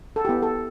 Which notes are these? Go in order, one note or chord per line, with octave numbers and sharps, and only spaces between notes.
A4
B3 E4 G4
A4